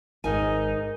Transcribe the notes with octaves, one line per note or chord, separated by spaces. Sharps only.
G#1 G#2 D#4 A#4 G#5